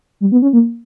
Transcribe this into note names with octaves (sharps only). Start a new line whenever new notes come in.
G3
B3
C#4
A#3